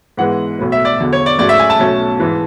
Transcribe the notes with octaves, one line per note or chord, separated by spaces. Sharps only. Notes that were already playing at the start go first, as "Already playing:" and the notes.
G#2 E3 G#3 B3 F#5
B1 A2 F#3
E5
D5
E2 D3 F#3
C#5
D5
G#2 F#3 A3 C#4 D5
E5
G#5
A5
B1 B2 F#3 A3 C#4
G#2 E3